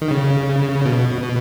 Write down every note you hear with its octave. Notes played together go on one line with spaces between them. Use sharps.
D#3
C#3
B2
B2